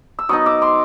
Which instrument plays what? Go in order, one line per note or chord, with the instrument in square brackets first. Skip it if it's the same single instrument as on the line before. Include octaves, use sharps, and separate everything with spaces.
[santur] E6
F#3 B3 D#4 C#6 D#6
D6 E6
C6 D6